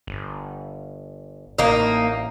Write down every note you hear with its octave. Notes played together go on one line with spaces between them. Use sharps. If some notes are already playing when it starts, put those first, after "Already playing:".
G1
A1 A#3 D#4